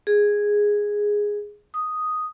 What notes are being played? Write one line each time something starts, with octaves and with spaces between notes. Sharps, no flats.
G#4
D#6